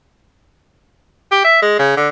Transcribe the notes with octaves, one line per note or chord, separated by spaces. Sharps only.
G4
E5
G#3
C#3
D3